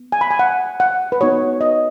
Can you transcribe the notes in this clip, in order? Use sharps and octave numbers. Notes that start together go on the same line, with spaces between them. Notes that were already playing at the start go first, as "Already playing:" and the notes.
Already playing: B3
G#5
B5
G#5
F#5
F#5
B4
B3 D#4 F#4 C#5
D#5